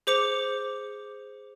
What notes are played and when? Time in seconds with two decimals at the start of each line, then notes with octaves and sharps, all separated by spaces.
0.07 G#4 C5 D6 C#7 F7